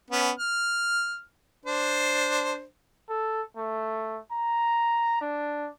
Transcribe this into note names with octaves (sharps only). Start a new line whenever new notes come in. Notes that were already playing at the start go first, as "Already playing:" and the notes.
B3 C#4
F6
D4 C5
A4
A3
A#5
D4